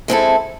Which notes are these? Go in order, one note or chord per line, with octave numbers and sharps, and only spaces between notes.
G#3 C4 E4 A4